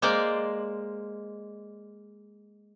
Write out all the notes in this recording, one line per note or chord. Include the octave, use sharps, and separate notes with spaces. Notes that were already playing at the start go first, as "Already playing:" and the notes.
G#3 A#3 C5 D5